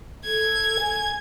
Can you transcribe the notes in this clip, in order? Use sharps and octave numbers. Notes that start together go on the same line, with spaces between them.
A4 G#6
G#5